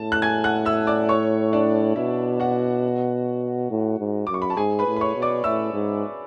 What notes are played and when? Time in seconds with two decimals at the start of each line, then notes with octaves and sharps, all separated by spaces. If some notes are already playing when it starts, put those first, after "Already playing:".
Already playing: A2 A5
0.12 F#6
0.22 G#5 G#6
0.44 F#5 F#6
0.65 E5 E6
0.87 D5 D6
1.09 C#5 C#6
1.53 D4 D5
1.96 B2 E4 E5
2.40 F#4 F#5
3.71 A2
3.99 G#2
4.27 F#2 D6
4.34 C#6
4.42 B5
4.50 A5
4.57 G#2 G#4 G#5
4.79 B4 B5
4.87 A2
4.96 B5
5.01 C#5 C#6
5.16 B2
5.22 D5 D6
5.44 A2 E5 E6
5.73 G#2